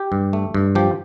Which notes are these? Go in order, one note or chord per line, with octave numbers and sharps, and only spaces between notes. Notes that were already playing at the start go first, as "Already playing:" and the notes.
Already playing: G4
G2
A3
G2
F3 G4